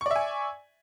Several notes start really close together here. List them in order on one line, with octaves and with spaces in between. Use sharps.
C#6 D5 E5 G#5